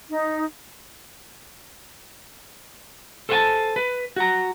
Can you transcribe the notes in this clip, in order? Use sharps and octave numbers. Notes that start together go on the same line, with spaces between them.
D#4
A4 C5 C#5 F#5 G#5 A5
B4
F#4 A#5